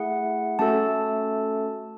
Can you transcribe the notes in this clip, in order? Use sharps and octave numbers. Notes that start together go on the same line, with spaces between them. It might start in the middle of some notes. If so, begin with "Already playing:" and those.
Already playing: A3 E4 G#4 F#5
A3 C#4 F#4 A4 A5